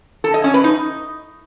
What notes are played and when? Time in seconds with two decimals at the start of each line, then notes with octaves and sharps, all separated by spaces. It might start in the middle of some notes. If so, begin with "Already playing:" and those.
0.24 A4
0.34 D#5
0.44 C#4
0.54 B4
0.64 D#4